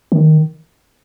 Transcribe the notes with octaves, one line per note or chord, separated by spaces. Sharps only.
D#3